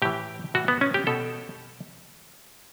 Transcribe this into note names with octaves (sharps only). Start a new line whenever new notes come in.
A2 E3 G4
A2 E3 F#4
B3
C#4
G4
B2 A4